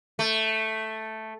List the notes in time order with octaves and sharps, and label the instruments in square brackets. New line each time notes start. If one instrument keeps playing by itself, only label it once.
[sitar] A3